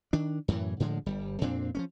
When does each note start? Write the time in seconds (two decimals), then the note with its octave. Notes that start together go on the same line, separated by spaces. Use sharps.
0.13 D#3 D4
0.48 F#2 A2 D3 E3
0.80 A2 D3 F3 G#3
1.06 G1 G3
1.41 F2 A#2 C4 D4
1.75 F3 A3 C#4